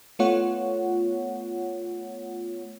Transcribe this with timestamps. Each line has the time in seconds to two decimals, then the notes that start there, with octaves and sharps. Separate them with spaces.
0.19 A3 B3 F4 C#5 F#5